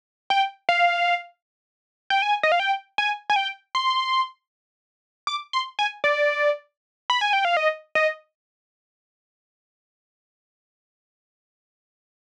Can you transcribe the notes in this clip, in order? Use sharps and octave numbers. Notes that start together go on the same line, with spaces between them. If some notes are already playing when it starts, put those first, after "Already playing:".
G5
F5
G5
G#5
D#5
F5
G5
G#5
G#5
G5
C6
D6
C6
G#5
D5
B5
G#5
G5
F5
D#5
D#5